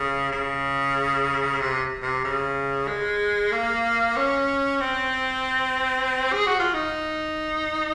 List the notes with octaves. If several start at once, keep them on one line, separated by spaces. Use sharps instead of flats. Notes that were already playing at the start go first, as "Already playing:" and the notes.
Already playing: C#3
C#3
C3
C3
C#3
G#3
A#3
C#4
C4
G#4
F#4
F4
D#4